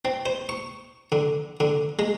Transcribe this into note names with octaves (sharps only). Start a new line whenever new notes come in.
C4
C5
C#6
D3
D3
G#3